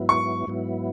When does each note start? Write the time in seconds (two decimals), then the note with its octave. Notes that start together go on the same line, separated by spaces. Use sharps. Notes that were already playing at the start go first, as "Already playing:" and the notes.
Already playing: G#2 F#3 B3 E4
0.09 C#6
0.47 G#2 F#3 B3 E4